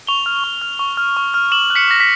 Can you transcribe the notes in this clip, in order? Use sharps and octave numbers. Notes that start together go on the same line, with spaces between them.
C#6 F7 G7
F6
C#6
F6
C#6
F6
C#6
F6
D6 E7 F#7
F#6
B6 C#7
D6 A#6
B6